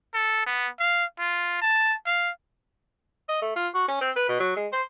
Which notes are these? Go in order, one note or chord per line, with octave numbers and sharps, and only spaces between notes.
A4
B3
F5
F4
A5
F5
D#5
A3
F4
F#4
C#4
C4
B4
B2
F#3
G#3
C5